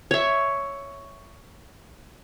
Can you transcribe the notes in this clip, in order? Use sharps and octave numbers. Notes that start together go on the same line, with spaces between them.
C#5 E5